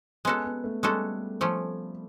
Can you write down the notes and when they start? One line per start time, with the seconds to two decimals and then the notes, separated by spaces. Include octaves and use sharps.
0.25 G#3 B3 C#4 F#4 A4
0.45 B3
0.64 A3
0.83 G3 G#3 C#4 F#4 A4
1.41 F3 A3 C#4